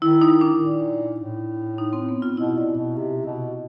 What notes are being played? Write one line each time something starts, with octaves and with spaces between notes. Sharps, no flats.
D#3 E4
D#4
D4
A#2
A2
D#4
C4
B3
F4
B2 E4
A#2
B2
C3
B2